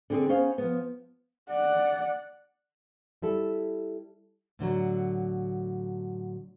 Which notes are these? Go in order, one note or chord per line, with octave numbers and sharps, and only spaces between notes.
D3 C4 G#4
B3 C#4 C5 F5
F3 B3
D5 F#5
G3 E4 A4
A2 D3 E3 F#3